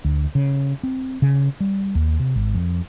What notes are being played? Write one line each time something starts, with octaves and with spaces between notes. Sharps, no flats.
D2
C#3
C4
C#3
G3
D#2
C3
G#1
F2